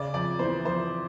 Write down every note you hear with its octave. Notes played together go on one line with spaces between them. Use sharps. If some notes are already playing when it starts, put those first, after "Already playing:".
Already playing: C#3 D5
F2 D5
E3 C5
F2 C5